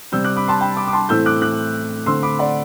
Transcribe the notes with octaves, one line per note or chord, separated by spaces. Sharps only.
C3 G3 C4 E6 G6
D6 F#6
B5 D6
A5 C6
G5 B5
B5 D6
D6
A5 C6
A2 E3 A3 C4 E6 G6
D6 F#6
D6 F#6
D3 A3 C4 C6 E6
B5 D6
D5 F#5